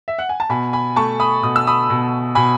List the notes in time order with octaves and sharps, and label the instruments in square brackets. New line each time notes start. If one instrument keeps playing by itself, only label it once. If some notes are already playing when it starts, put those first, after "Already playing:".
[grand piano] E5
F#5
G#5
A5
B2 G#5 B5
G#5 B5
A3 A5 C#6
B5 D#6
B2 D#6
E6
B5 D#6
B2
B2 G#5 B5